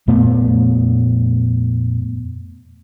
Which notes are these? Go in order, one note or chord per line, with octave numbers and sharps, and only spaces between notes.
F2 A#2 A3 B3